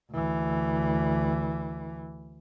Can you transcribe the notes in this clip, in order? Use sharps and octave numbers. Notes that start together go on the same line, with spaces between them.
D2 E3